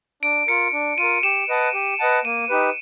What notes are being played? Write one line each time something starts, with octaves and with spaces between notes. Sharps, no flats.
D4 D7
F4 A#4 C#7
D4
F4 A#4 D#7
G4 E7
B4 D#5 F#5 A5
G4
B4 D#5 F#5 A5
A#3 D#7
D#4 G4 B4